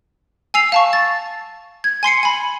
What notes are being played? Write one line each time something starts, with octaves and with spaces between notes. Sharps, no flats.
G#5 E6 C7 F7
F5 A5 C#6
A6
G#6
G#5 C6 C7 C#7
G#5 B5